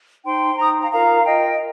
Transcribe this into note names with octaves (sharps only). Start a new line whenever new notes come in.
D#4 C5 G5 C6
D#4 C5 A#5 D#6
F5 A#5
F4 A#4 F5 A#5
F4 A#4 D#5 G5